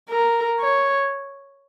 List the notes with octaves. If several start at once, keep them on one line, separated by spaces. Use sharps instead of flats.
A#4
C#5